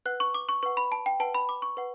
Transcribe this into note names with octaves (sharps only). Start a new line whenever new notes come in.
B4 F#5 F#6
C#6
D6
C#6
B4 F#5 C#6
B5
A5
G5
B4 F#5 A5
B5
D6
C#6
B4 F#5